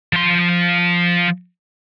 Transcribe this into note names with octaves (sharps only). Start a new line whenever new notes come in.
F3 C6